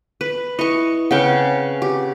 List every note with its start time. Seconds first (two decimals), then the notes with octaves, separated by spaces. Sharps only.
0.21 B4
0.59 E4 B4 D#5 C#6
1.11 C#3 C4 B4 F#5 G5
1.82 G4